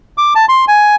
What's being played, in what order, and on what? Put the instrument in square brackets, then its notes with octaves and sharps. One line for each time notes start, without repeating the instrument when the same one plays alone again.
[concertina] D6
A5
C6
G#5